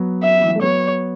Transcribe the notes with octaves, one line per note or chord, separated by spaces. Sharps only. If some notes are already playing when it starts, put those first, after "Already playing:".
Already playing: F#3 B3
E5
E3
F#3
A3
F#3 B3 C#5